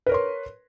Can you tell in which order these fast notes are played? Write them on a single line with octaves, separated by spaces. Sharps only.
B4 A#4 C#5 C6